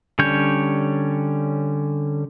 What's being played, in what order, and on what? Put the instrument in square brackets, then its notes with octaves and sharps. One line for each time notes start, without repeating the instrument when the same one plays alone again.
[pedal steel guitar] D3 G3 C#4 C#5 G6